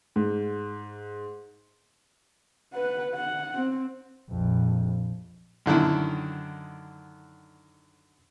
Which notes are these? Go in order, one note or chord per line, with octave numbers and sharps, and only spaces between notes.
G#2
B4 F#5
F#5
C4
A#1 F2
F#2 D3 D#3 E4